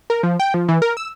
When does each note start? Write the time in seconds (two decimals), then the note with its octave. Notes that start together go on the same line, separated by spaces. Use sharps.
0.10 A#4
0.23 F3
0.40 G5
0.54 F3
0.68 E3
0.82 A#4
0.97 E6